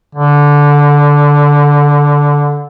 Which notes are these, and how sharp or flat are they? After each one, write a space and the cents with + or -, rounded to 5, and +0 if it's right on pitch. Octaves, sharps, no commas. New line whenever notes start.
D3 -10